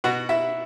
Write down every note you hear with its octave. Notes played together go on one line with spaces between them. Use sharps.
B2 F#4 F#5
E4 E5